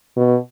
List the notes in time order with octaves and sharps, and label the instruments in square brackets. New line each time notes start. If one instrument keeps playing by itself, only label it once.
[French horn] B2